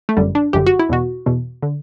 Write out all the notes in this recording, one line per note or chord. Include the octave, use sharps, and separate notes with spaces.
A3
G1 F#2 D3 G3
D4
G1 F#2 D3 G4
F#4
E4
E2 B2 F#4
E2 B2
D3